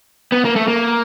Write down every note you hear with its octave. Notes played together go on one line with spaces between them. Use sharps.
B3
A#3
A3
A#3